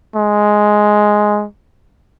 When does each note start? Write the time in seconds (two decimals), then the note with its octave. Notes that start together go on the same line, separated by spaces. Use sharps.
0.16 G#3